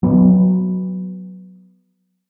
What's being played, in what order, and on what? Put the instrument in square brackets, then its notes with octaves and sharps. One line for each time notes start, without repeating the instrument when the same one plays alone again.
[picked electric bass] F#3 B3